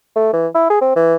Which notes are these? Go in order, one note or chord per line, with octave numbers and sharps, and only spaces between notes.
A3
E3
E4
G#4
C4
E3